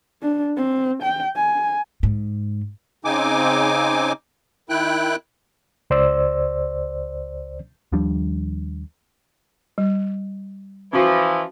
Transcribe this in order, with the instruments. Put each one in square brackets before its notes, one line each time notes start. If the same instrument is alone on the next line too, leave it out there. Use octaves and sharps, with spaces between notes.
[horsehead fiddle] D4
C4
G5
G#5
[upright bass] G#2
[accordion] C#3 C4 D#4 G#5 D6
D#3 E4 G5 F#6
[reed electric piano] C#2 C5 D5 E6
[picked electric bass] D#2 F3 G3 D4
[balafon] G3
[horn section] E3 F3 [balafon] C#4 F#4